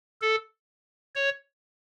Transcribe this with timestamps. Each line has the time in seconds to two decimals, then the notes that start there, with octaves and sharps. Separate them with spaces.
0.21 A4
1.16 C#5